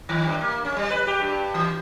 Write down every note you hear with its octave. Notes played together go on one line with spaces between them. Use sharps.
D#3
G2
A#3
C#4
G3
B4
G4
G2
E3